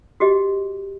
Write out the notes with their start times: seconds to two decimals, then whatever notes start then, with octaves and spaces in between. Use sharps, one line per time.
0.20 F#4 G4 D#5